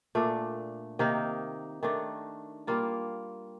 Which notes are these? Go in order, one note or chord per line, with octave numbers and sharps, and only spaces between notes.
A#2 A3 D4
C3 D#3 A#3 D#4
D#3 A3 D4
G3 A#3 F4